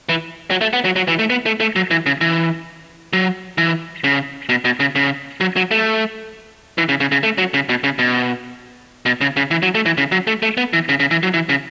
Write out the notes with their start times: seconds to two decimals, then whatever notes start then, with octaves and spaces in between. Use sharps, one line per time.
0.09 E3
0.50 F#3
0.61 A3
0.73 B3
0.85 F#3
0.96 F#3
1.08 E3
1.19 A3
1.30 B3
1.46 A3
1.60 A3
1.76 F#3
1.91 E3
2.06 C#3
2.21 E3
3.13 F#3
3.58 E3
4.04 C#3
4.49 B2
4.65 B2
4.80 C#3
4.95 C#3
5.41 F#3
5.56 F#3
5.71 A3
6.78 E3
6.89 C#3
7.00 C#3
7.12 C#3
7.23 A3
7.38 F#3
7.54 C#3
7.69 B2
7.84 C#3
7.99 B2
9.06 B2
9.21 C#3
9.37 C#3
9.51 E3
9.63 F#3
9.75 A3
9.86 E3
9.98 C#3
10.12 F#3
10.27 A3
10.43 A3
10.57 B3
10.73 E3
10.89 C#3
11.00 C#3
11.11 E3
11.23 F#3
11.34 E3
11.49 C#3